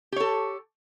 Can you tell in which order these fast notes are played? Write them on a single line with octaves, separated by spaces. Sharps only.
G4 C#5 A4